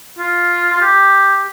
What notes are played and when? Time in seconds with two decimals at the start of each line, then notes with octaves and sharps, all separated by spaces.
0.18 F4
0.72 F4
0.82 G4